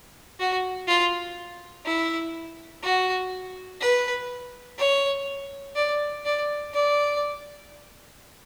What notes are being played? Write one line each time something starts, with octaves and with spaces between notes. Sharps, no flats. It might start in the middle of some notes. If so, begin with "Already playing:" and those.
F#4
F4
E4
F#4
B4
C#5
D5
D5
D5